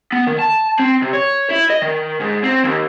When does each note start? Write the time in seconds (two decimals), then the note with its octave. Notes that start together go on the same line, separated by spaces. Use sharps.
0.12 B3
0.27 D#3
0.39 A5
0.80 C4
1.02 C3
1.14 C#5
1.51 E4
1.70 D#5
1.82 D#3
2.20 G#2
2.43 C4
2.64 D#2